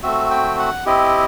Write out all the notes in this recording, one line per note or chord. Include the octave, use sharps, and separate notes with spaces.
A3 C4 F#4 E5
G5
F#5
C4 E4 G4 D#5